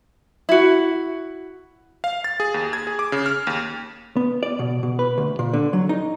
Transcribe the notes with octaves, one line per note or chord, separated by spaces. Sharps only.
E4 F#4
F5
A6
G#4
D#2
G#6
G#4
D6
C#3
F6
D#2
B3
D5
B2
B2
B4
D2
A#2
D3
F#3
D#4